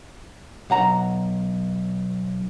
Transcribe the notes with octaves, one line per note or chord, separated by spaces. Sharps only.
B1 F#5 A#5